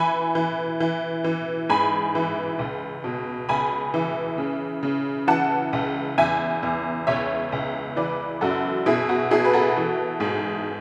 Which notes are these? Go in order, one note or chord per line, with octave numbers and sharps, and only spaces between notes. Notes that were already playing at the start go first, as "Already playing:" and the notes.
Already playing: E3 G#5 B5
E3
E3
E3
G#2 G#5 B5
E3
C#2
B2
C#2 G#5 B5
E3
C#3
C#3
E3 F#5 A5
C#2
E2 E5 G#5
E2
C#2 C#5 E5
C#2
E3 B4 D5
F#2 F#4 A4
B2 E4 G#4
F#4
B2 E4 G#4
B4
F#4 A4
E3
G#2